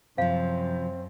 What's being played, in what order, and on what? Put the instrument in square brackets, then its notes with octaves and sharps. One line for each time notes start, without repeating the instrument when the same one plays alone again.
[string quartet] F#2 [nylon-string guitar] C3 F3 [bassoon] C4 [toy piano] F5